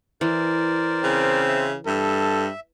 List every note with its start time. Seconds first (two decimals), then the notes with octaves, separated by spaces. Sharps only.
0.21 E3 A#4 C5 D5
1.04 C#3 C4
1.48 E5
1.86 G2 A4 E5